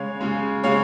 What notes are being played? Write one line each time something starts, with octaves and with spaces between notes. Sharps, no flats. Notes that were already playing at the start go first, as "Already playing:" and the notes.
Already playing: C#3 G#3 C#5 F5
C#3 G#3
C#3 G#3 C#5 F5